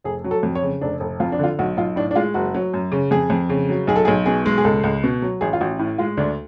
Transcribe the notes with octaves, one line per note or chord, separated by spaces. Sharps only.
F1 G#4
F#3
A4
F2
C#5
C#3
F1 D4
F1
F2 F4
D4
D3 F4
B1 F#4
B1 F4
A2 D4
D4
G#3 F4
F#1 F#4
F#3
F#2
C#3
F2 G#4
F2
C#3
F#3
B1 G#4
A4
G#4
B1
B2 G#4
G#3
G#4
C#2 A4
C#2
B2
F#3
A1 G#4
F4
A1 F#4
A2
G#3 F4
D2 D4